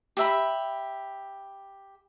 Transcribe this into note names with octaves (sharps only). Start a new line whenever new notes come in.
G4 E5 B5